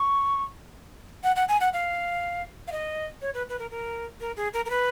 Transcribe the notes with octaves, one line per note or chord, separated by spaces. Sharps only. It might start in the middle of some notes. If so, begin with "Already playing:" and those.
Already playing: C#6
F#5
F#5
G#5
F#5
F5
F5
D#5
C#5
B4
B4
A#4
A#4
A#4
G#4
A#4
A#4
B4